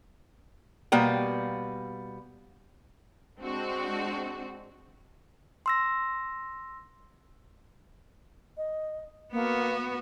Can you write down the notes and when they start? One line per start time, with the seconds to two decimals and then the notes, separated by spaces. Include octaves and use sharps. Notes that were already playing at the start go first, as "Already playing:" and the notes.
0.92 B2 G3 A#3 B3 G5
3.39 G#3 C4 D4 F#4
5.66 C6 E6 A#6
8.57 D#5
9.33 A#3 B3 F#4